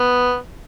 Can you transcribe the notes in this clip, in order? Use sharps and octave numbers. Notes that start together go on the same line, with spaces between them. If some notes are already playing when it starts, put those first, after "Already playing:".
Already playing: B3